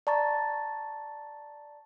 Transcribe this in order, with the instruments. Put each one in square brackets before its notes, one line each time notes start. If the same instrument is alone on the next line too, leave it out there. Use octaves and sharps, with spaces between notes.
[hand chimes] D5 A5 A#5 C#6 A6